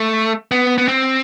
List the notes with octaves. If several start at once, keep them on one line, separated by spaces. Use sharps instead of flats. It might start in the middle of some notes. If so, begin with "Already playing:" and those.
Already playing: A3
B3
B3
C4